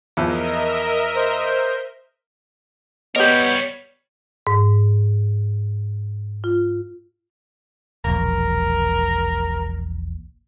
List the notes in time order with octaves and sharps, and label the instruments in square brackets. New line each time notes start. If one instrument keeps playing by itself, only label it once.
[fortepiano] E2 F3 [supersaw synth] A#4 D#5 E5
[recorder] C5
[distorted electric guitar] G3 A#4 [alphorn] B3 [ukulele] G4 D#5 [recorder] C#5
[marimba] G#2
F4
[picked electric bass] E1 A#1 [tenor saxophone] A#4